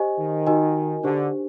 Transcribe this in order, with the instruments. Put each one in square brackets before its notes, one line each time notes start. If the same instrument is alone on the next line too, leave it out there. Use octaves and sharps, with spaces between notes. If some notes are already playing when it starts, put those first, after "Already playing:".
Already playing: [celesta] G4 C5 D#5 G#5
[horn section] D#3
[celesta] D#4 F#4 A#4 D#5 G#5
[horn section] D3 [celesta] D4 G4 C5